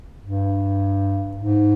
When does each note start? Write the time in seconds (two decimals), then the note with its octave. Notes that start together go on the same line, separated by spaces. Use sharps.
0.23 G2
1.37 G#2